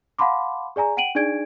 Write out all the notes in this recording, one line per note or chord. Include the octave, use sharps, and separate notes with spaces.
F5 F#5 A5 B5 C6 D6
G#4 D5 G#5 A#5
F#5 G5 D7 D#7 F#7
D4 D#4 G#4 D5 G#6 D7